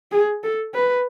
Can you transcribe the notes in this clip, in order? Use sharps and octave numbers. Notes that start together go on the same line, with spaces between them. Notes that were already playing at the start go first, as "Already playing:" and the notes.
G#4
A4
B4